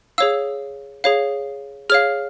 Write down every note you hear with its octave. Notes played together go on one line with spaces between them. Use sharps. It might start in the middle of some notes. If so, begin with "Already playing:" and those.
G#4 C#5 F5 E6
G#4 C#5 F5
G#4 C#5 F5 F6